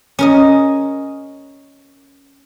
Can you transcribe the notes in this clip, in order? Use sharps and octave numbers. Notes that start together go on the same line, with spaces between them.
C#4 A#4 D#5